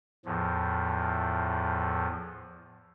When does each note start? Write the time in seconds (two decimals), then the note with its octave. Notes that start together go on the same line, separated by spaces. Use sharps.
0.25 E2 A2 F3